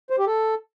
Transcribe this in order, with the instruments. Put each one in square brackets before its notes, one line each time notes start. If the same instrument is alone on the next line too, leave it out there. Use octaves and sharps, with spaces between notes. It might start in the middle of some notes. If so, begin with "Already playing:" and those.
[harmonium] C5
G4
A4